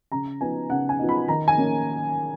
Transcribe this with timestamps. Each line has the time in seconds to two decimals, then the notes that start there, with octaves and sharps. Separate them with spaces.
0.12 C#3 A#5
0.40 F3 B3 D#4 G#5
0.70 C#3 F#5
0.89 G#5
0.99 F3 B3 D#4
1.09 B5
1.28 D#3 A#5
1.48 G#5
1.57 A#3 C#4